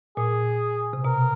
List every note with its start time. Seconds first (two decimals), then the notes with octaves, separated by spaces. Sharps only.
0.17 A#2 G#4
0.93 C3
1.05 B2 A#4